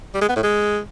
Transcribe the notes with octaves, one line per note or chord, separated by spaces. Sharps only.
G3
G#3
B3
A2
G#3